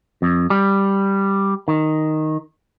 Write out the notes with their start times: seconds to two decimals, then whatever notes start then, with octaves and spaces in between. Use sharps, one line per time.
0.22 F2
0.50 G3
1.68 D#3